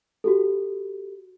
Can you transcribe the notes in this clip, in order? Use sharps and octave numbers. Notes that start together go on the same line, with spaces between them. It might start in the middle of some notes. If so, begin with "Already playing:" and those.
F#4 G4 A4